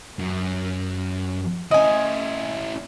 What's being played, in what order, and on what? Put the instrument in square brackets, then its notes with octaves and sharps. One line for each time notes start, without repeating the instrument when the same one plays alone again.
[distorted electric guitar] F#2
[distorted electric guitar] C#4 E4 [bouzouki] D#5 G#5